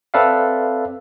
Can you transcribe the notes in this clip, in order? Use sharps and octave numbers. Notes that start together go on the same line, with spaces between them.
C4 A4 B4 D5 E5 F5